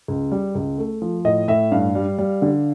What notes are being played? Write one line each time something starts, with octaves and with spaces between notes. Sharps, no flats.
C#2
G3
C#2
A3
F3
A2 D#5
A2 E5
G2 F5
G3
G3
D3